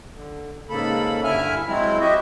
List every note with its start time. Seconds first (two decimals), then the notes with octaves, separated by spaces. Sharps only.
0.13 D3
0.69 G#2 C#3 A#3 A4 B5
1.24 G2 D3 E4 E5 G#5 F6
1.67 F#3 G#3 C4 E4
2.01 F#4 G4 D#5 E5